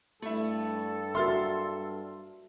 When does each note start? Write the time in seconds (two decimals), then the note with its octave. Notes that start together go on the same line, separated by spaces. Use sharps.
0.22 G2 A3 E4 A4
1.15 F#4 A#4 E5 C6 F6 A6